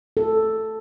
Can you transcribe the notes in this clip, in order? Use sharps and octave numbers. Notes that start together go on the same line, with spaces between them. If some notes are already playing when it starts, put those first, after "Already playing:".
A4